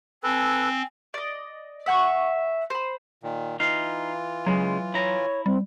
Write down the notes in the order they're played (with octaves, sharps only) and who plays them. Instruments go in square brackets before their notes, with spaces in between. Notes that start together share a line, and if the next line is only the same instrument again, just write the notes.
[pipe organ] C4 [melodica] A4 B4 [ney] G#5
[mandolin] D5 D#5
E5 F#5 G5 C#6
C5 B5
[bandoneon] A#2 D#3
[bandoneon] E3 F4 [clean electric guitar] D#4 F5
[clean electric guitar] C#3 G#3 [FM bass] F#3
[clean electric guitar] E4 A#5 [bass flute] C#5
[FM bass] G3 [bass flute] C4